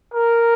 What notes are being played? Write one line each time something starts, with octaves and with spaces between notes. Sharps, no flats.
A#4